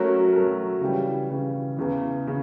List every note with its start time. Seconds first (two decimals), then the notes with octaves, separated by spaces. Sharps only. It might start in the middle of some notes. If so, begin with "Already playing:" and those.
Already playing: F#3 A3 C#4 F#4 A#4
0.33 F#3 A3 C#4 F#4 A#4
0.81 C#3 E3 G3
1.29 C#3 E3 G3
1.77 E2 C#3 E3
2.27 C#3